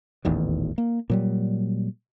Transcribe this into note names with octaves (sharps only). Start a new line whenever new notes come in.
D#1 A1 E2 D#3
A#3
A#2 F#3 G3